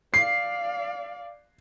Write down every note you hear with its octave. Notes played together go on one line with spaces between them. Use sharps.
D5 F5 C7